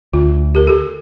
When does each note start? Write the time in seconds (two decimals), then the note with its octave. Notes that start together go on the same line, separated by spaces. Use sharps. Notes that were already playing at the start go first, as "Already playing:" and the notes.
0.13 D2 F4
0.55 G4 A#4
0.67 G4 A4